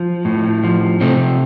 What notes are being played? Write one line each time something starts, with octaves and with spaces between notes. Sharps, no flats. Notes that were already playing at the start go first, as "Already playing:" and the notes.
Already playing: F3
A2
F3
C3 A3 C4